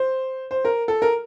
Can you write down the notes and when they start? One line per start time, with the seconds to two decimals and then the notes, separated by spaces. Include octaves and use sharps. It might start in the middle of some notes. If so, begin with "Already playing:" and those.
Already playing: C5
0.51 C5
0.65 A#4
0.88 A4
1.02 A#4